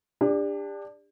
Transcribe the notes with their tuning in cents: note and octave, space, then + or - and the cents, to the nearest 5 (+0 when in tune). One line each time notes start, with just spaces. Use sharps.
D4 +5 G4 +40